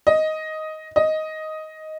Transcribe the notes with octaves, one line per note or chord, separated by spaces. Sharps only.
D#5
D#5